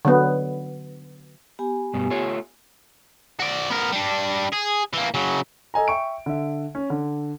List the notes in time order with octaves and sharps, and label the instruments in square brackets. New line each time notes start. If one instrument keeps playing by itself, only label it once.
[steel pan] D3 F#3 B3
[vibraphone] B3 G4 G#5
[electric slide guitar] G2 B2
A3 F4 C#5
[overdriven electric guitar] F#4 D5
B3 A#4
G3 D4
G#4
E3 A#3
C#3 F#3
[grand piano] A4 D#5 G#5 A#5
E5 G5 C#6 D7
D3 E5
C#4
D3